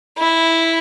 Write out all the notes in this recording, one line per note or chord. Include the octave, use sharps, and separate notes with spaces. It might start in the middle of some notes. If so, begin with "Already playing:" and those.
E4